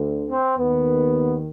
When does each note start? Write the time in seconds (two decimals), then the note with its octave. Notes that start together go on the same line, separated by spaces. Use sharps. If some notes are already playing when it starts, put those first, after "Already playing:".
Already playing: D2 D3
0.28 C4
0.57 D#2 D#3 B3